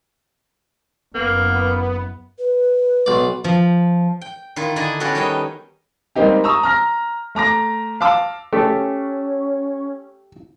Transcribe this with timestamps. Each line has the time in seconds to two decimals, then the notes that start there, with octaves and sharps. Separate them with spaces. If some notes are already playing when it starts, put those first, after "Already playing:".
1.15 F#1 A#3 B3
2.39 B4
3.06 B1 D5
3.44 F3
4.21 G5
4.56 D#3 E4 F4
4.76 D3 E4 D5 D#5 G#5 A#5
5.00 B3 C#4 F#4 G4 A4
5.15 D#3 G3 C#5 D#5 G5
6.16 G3 G#3 A#3 C4 D#4 G4
6.44 A#5 C#6 D#6 E6
6.63 A#5 F6 A#6
7.35 A3 A#5 D6 A#6
8.01 F5 A5 D6 E6
8.53 A3 C#4 G4